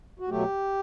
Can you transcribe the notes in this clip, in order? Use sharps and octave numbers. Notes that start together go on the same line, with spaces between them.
F#4
B2 F#3 A3 G4